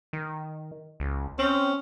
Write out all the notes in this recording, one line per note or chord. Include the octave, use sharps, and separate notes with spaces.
D#3
C#2
C4 C#4